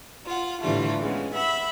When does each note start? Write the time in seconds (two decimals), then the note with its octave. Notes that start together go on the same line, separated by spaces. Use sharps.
0.25 F4 F#5
0.60 A2 D3 E3 G3 A3 F4
1.00 C#3 G#3 B3
1.34 E5 F#5 B5 E6